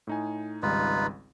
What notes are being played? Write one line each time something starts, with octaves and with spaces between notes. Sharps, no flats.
A2 D#4 G#5
G#1 C#2 G3 D#4 F4 B4